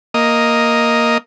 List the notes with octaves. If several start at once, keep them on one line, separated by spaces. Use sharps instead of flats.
A#3 D#5